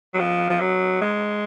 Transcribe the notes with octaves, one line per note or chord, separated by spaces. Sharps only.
F#3
F3
F3
F#3
G#3